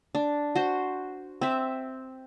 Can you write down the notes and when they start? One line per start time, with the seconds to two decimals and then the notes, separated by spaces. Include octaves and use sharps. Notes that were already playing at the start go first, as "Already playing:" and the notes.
0.15 D4
0.55 F#4 C5
1.41 C4 E5